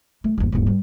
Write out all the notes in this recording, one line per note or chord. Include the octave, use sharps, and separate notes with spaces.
A3
G1 D#2
D#1 G#2
G3